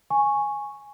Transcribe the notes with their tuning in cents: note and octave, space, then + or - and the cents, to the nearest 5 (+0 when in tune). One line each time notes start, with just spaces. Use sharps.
G#5 +0 C#6 -5